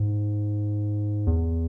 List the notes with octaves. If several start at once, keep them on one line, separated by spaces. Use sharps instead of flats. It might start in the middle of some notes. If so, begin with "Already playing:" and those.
Already playing: G#2
E2